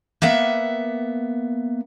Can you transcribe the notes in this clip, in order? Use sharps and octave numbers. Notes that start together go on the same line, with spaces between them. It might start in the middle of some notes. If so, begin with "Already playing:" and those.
A#3 B3 E5 F#5